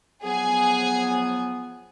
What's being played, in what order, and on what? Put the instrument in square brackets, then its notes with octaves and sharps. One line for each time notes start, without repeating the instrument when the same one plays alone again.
[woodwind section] F3 F#3 B3 [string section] G#4 G#5